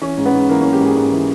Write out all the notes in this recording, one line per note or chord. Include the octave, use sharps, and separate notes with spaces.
E3 C#4
G#2
B3
G#2
E3 A#3
E3 C#4
G4
G#2 G#4
G#2
E3